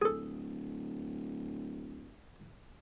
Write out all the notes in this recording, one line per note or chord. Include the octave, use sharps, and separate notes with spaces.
D1 G#4 A4